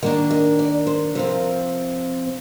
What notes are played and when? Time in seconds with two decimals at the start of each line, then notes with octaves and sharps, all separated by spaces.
0.02 D#3 A#3 D4 D#5
0.31 D#5
0.59 D5
0.87 C5
1.15 C3 F3 C4 A#4